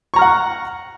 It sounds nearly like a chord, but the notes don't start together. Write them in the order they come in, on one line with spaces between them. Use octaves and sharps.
C#6 A#5 F6 F#5